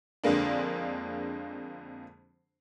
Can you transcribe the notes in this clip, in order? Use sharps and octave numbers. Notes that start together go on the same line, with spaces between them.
F2 D3 G#3 A#3 D4